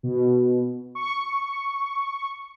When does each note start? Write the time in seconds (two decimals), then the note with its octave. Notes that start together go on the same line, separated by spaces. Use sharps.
0.03 B2
0.95 C#6